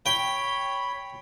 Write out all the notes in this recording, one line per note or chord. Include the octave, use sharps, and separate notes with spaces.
C#5 G5 B5